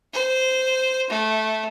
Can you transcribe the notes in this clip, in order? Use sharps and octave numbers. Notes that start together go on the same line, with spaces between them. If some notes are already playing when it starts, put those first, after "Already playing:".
C5
A3